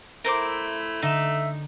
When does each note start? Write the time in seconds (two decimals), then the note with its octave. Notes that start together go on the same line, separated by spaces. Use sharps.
0.25 A3 E4 A#4 C5 D6
1.02 D3 D#4 D5 E5 E7